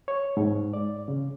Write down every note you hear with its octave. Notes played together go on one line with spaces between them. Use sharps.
C#5
G#2
D5
C#3